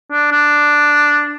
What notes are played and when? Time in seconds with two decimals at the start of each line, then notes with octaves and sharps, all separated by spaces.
0.12 D4
0.32 D4